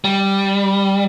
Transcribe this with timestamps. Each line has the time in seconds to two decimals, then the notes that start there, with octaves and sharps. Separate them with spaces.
0.04 G3